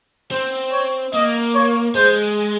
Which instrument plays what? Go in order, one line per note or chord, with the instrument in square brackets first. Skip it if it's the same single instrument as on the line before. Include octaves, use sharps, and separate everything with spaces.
[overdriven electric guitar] C4 [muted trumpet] C5
[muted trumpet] C#5
[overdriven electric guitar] A#3 [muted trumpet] D#5
[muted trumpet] C#5
[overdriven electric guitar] G#3 [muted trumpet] C5